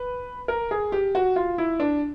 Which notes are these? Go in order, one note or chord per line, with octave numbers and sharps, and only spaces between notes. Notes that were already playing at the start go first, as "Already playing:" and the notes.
Already playing: B4
A#4
G#4
G4
F#4
F4
E4
D4